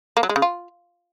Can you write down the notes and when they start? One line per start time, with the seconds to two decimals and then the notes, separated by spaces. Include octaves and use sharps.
0.17 A#3
0.23 F#3
0.29 G#3
0.36 C#3
0.42 F4